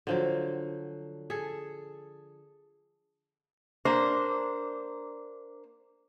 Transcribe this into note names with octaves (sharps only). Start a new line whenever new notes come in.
D3 F3 F#3
G#4 A4
A#3 D4 C5